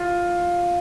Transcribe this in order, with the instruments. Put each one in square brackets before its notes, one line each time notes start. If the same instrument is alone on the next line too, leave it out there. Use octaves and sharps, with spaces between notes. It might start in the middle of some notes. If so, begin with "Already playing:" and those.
Already playing: [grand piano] F4